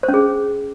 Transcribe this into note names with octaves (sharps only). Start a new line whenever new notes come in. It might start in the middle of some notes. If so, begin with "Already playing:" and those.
C5
C#4
G#4